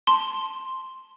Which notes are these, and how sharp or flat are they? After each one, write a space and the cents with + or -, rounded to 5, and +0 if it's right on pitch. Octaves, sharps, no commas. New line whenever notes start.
A5 +0 C6 +0